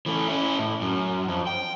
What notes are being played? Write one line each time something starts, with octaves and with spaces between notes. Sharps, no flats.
E3 A3
C#4 E4
A2
F#2
F2
G5